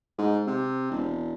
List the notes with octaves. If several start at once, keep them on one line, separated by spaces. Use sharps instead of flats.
G#2
C3
E1